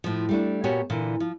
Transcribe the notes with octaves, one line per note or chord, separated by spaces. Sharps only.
A2 F3
G3 A3 D4
A#2 B3 F#4 G4 C#5 G#5
A#2 D3 E3
F3